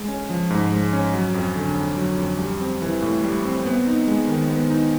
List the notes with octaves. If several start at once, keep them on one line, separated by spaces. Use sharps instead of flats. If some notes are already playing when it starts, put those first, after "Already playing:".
Already playing: G#3
C#4
F3
G#2
G#3
C#4
F#3
F2
D3
F2
F#3
F2
G3
C4
E3
A2
G3
C4
B3
D#4
G#3
D#3
B3
D#4